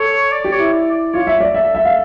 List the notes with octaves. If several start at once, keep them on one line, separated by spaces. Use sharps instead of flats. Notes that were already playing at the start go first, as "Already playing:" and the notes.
Already playing: A4 C#5
D5
G4
C#5
E4
D5
D5
F4 C#5
E5
D5
A4 E5
E5
F5